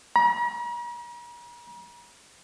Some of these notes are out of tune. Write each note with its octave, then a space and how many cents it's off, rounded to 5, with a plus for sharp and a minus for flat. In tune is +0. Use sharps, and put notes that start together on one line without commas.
A#5 +45